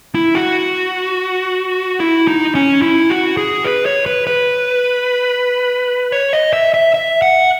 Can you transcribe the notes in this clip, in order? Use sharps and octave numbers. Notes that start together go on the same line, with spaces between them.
E4
F#4
E4
D#4
C#4
E4
F#4
G#4
B4
C#5
B4
B4
C#5
D#5
E5
E5
E5
F#5